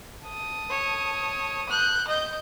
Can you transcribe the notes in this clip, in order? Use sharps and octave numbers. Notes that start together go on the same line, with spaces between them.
A5 D#6
C#5
F#6 G6
D#5 G6